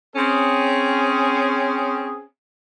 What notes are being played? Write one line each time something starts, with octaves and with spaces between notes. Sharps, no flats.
C4 C#4 G#4